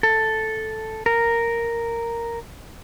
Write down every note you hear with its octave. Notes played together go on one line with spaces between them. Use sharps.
A4
A#4